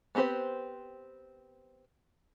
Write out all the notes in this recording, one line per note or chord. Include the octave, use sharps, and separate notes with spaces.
B3 C4 G4 B4 C5